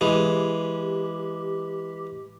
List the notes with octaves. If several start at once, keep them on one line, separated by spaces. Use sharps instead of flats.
E3 G#3 G4